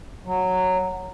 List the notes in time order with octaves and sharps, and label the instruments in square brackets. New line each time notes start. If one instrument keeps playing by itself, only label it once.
[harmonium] F#3